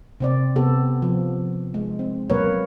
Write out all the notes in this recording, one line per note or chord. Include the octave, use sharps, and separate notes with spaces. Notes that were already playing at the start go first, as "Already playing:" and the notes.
C3 C4 D5
C3 B3 G4 A4
F3
G#3
C4
B2 F#3 A#3 A#4 B4 C#5